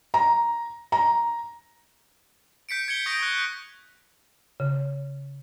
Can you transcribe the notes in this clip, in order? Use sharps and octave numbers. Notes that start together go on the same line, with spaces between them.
A#5
A#5
G6 B6 C#7 D7
G#6 C#7 G7
C#6 D#6 G6 A#6 D7
C#6 F#6
C#3